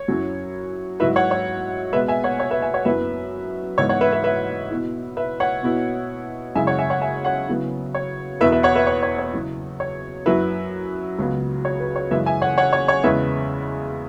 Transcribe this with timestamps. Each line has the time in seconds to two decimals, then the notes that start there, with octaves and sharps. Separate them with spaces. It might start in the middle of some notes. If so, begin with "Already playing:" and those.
Already playing: C#5
0.08 F#2 F#3 C#4 E4
1.00 G#2 F#3 E4 B4 E5
1.16 C#5 F#5
1.31 C#5
1.93 B2 G#3 B3 B4 E5
2.08 E5 G#5
2.24 C#5 F#5
2.40 C#5
2.51 B4 E5
2.62 E5 G#5
2.74 C#5 F#5
2.85 F#2 F#3 B3 E4 B4 E5
3.78 G#2 E3 B3 E4 C#5
3.89 C#5 F#5
4.01 B4 E5
4.12 B4 E5
4.24 B4 E5
4.71 B2 B3 E4
5.17 B4 E5
5.40 C#5 F#5
5.63 B2 B3 E4
6.55 F#2 C#3 G#3 E4 E5 G#5
6.67 C#5 F#5
6.79 E5 G#5
6.90 C#5 F#5
7.02 E5 G#5
7.25 C#5 F#5
7.48 C#3 F#3 B3 E4
7.95 C#5
8.41 E2 B2 B3 E4 B4 E5
8.52 B4 E5
8.63 C#5 F#5
8.75 B4 E5
8.87 C#5
9.03 C#5
9.18 C#5
9.33 C#3 F#3 E4
9.80 C#5
10.26 F#2 F#3 E4 B4 E5
11.18 C#2 C#3 F#3 B3
11.65 C#5
11.80 B4
11.96 C#5
12.11 F#2 C#3 E3 G#3 C#4 B4 E5
12.26 E5 G#5
12.42 C#5 F#5
12.58 C#5 F#5
12.73 C#5
12.88 C#5
13.04 E2 C#3 G#3 C#4 E4 B4 E5